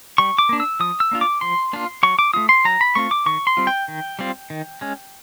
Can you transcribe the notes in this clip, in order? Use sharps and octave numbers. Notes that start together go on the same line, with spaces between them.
G3 C#6
D6
A#3 D4
E6
F3 D#6
E6
A#3 D4 F4
D6
F3 C6
A#3 D4 F4
F#3 C#6
D6
A3 C4 F4 D#6
C6
F#3 A#5
B5
A3 C4 F4 C#6
D6
D#3 C#6
C6
G3 C4 F4
G5
D#3
G3 C4 F4
D#3
G#3 C#4